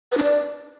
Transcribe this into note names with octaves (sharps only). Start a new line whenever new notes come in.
B4
D4
D5